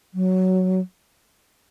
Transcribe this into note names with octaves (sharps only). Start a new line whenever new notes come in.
F#3